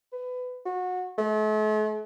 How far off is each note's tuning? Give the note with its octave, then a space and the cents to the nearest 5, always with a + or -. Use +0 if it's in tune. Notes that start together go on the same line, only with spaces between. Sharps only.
B4 +25
F#4 -25
A3 -45